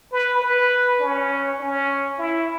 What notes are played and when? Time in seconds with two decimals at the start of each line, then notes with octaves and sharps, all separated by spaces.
0.12 B4
0.42 B4
1.00 C#4
1.60 C#4
2.18 E4